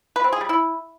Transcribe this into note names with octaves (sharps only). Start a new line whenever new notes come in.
B4
C4
G#4
G3
E4